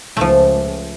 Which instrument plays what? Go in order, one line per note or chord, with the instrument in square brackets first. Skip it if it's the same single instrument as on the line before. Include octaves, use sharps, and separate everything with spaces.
[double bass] C#2 [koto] F3 A3